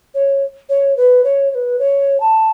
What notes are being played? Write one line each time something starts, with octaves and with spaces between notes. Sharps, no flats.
C#5
C#5
B4
C#5
C#5
B4
C#5
A5